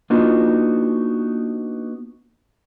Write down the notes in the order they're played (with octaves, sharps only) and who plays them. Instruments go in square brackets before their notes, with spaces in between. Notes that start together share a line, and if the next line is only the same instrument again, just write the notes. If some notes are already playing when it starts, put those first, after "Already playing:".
[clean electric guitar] A#3 B3 D4 D#4 F4 F#4